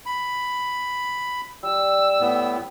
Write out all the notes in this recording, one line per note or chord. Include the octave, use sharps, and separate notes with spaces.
B5
G3 E6
A2 B3